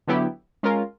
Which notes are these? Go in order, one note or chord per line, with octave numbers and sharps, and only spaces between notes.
D3 F#3 B3 E4 G4
G#3 C#4 F4 A#4